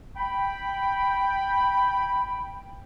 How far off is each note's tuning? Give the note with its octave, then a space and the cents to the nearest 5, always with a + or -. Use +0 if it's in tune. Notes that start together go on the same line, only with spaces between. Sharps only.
G5 +0 B5 +0